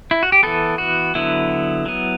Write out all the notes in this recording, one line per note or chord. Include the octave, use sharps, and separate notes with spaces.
E4
F#4
G4
E3 B3 A4
F#4
D3 F#3 B3 E4
F#3 B3